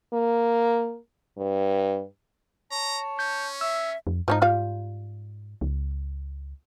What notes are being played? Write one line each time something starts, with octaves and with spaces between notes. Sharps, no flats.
A#3
G2
C#5 A5 A#5
C#4 G6
E5 E6
F2
G#2 F3 C#4 D#4
G3 F4 F5
C#2